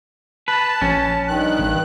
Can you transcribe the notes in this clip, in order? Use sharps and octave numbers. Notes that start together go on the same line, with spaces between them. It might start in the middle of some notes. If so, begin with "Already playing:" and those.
B4 A5
A#1 C#4
G2 D#3 F#6
A1